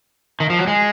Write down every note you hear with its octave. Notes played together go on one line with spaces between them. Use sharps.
D#3
F3
F#3
G#3